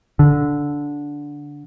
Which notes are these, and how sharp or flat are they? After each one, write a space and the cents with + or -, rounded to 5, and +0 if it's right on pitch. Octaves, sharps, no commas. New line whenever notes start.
D3 -10